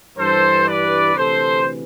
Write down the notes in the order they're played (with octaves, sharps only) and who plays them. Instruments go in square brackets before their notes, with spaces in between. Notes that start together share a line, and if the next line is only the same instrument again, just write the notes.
[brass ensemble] G2 E3 A4 C5
B4 D5
D2 C3 E3 A4 C5